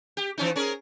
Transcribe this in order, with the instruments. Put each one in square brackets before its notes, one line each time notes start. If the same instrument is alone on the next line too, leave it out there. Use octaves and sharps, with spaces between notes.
[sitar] G4
E3 C#4 D#4
C#4 G#4 A#4